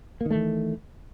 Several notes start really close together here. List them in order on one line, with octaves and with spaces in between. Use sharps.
A#3 D#3 A3 E3